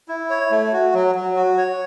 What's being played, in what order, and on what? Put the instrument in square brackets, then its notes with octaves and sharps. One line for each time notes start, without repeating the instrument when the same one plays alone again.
[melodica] E4
C#5
A3
F#4
F#3
F#3
F#4
C#5